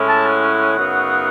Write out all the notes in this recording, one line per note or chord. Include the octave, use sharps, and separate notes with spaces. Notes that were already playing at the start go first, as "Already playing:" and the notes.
Already playing: A2 G#3 C#4 E4
A5
F#5
F#2 C#3 F#3 B3 D#4